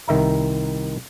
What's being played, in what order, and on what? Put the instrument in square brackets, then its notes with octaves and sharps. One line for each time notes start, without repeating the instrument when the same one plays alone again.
[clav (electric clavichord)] C2 D#3 E5 A#5